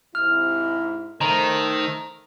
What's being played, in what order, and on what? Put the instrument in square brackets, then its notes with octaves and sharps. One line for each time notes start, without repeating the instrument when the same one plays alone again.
[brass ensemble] G#2 C3 E4 [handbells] F6
[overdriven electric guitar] D#3 [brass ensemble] A3 A4 C5 [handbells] A#5